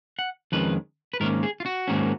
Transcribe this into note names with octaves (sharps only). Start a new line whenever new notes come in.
F#5
F2 D#3 G#3 C#4 B4
B4
G#2 D#3 A#3 C#4 A#4
G#4
F4
F#4
G#2 D#3 A#3 C#4